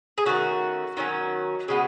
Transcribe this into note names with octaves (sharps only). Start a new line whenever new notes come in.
G#4
D#3 A3 C#4 F#4
D#3 F#3 A3 C#4
C#3 G#3 B3